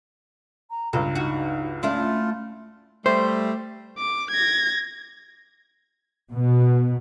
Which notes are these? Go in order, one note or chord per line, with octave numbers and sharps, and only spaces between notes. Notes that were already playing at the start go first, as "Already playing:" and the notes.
A#5
C#2 G2 A4 A#5
D#4 F#4
A3 C#4 D4 E4 F4
G3 A3 C5
D6
G#6 A#6
B2